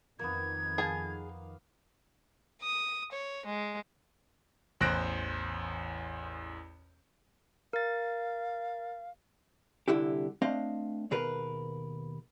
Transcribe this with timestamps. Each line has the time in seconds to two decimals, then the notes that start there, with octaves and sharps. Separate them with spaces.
0.19 F2 D#3 A#3 B3 G#6
0.78 G#4 F5 G#5 A5
2.62 D#6
3.12 C#5
3.46 G#3
4.81 A1 E2 C5 F#6 A#6 D7
7.73 A#4 F5 A6
9.88 C2 D3 E4 G4
10.42 A3 C4 D4 D#5 F5
11.11 D#2 B2 G#4 A#4 B4